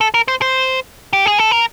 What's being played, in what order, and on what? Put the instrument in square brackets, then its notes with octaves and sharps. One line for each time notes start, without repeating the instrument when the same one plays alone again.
[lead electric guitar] A4
A#4
C5
C5
G4
G#4
A4
A#4